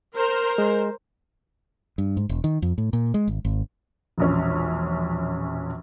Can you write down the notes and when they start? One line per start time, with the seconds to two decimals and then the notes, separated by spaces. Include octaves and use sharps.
0.16 A#4 C5
0.58 G#3
1.98 G2
2.17 G#2
2.29 E1
2.44 D#3
2.62 F2
2.78 A2
2.93 A#2
3.14 G#3
3.28 G#1
3.45 G#1
4.18 E1 A#1 C#4